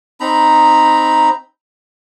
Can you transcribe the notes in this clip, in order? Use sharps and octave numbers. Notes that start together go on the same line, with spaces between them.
C4 D#4 A#5 B5